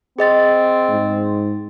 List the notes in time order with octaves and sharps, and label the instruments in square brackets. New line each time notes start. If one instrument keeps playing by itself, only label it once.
[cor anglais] C4 [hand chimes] G#4 D#5 A6
[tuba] G#2